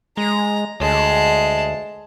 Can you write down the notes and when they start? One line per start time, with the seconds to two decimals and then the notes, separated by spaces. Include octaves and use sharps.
0.17 G#3 A#5
0.80 D2 G#3 A5